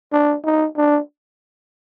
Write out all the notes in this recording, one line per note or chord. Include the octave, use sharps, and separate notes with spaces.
D4
D#4
D4